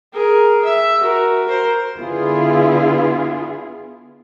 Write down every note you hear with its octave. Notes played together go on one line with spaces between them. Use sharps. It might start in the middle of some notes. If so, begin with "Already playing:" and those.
G#4 A#4
E5
F#4 A#4
A#4 C5
D3 B3 E4 F4 G#4